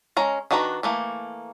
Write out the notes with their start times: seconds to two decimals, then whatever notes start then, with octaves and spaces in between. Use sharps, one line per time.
0.17 G#3 C#4 A#5
0.51 D#3 D4 F#4 B4 A#5
0.83 E3 A3 A#3